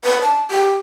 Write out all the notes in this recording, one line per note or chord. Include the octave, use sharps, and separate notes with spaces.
B4
A5
G4